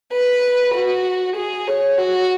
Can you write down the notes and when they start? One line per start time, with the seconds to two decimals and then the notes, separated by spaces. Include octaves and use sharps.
0.13 B4
0.74 F#4
1.36 G#4
1.67 C#5
1.98 F#4